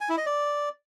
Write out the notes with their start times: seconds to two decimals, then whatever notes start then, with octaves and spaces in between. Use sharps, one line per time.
0.01 G#5
0.09 E4
0.18 D#5
0.26 D5